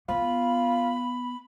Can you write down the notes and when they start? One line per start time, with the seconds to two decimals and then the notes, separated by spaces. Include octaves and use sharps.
0.08 B3 F4 B5